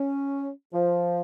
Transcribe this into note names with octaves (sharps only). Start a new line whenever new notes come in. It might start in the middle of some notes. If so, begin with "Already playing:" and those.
Already playing: C#4
F3